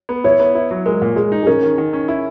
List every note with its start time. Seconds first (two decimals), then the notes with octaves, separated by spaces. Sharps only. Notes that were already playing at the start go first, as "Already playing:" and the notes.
0.09 B3
0.24 E4 C#5
0.40 B3
0.55 E4
0.71 F#3
0.86 G#3 A#4
1.02 A#2
1.16 G#3 G#4
1.32 D#4
1.43 G#4
1.47 C#4 A#4
1.63 D#3
1.78 D#3
1.93 C#4
2.08 E4